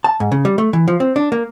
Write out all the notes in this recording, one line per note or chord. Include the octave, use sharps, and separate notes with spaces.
A5
G#2
C#3
G3
A3
E3
F3
C4
D4
A#3